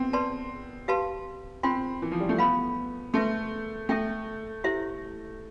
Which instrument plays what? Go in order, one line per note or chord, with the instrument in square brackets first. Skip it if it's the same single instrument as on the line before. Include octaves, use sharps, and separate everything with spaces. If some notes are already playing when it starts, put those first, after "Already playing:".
Already playing: [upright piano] B3 C4
[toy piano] B4 D5 A5 C6
G4 B4 F5 A5 C6
[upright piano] C4 [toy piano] F4 C5 G5 C6
[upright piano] E3
F3
G3
A3
[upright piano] B3 [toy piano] B4 F5 B5
[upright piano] A3 [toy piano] B4 E5 A5 C6
[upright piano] A3 [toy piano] A4 E5 G5
[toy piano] E4 G4 C5 E5